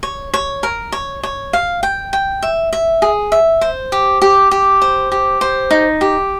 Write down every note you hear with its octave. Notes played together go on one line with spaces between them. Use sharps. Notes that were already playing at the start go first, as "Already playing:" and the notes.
C#5
C#5
A#4
C#5
C#5
F5
G5
G5
E5
E5
G#4
E5
C5
G4
G4
G4
C5
G4
C5
D#4
G4